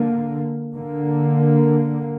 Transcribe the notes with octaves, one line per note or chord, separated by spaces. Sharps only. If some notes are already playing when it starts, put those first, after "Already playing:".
Already playing: D3 A#3
D3 A#3